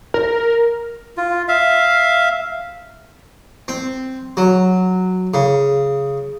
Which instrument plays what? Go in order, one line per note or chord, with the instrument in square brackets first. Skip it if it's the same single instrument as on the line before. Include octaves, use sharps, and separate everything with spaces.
[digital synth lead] A#4
[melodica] F4
E5 F5
[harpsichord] C4
F#3
C#3